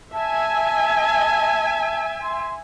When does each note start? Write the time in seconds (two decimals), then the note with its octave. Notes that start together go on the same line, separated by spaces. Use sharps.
0.13 E5 G#5 A5
2.21 C6